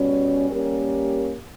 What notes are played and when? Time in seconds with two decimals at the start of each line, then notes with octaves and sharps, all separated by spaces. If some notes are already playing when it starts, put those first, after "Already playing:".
Already playing: B2 G3 C#4
0.51 G3 A#3 C#4 G4 A#4